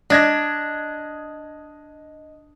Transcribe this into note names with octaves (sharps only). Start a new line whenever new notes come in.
D4 D#5 G#6 A#6